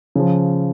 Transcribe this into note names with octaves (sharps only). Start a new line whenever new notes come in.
C#3 F3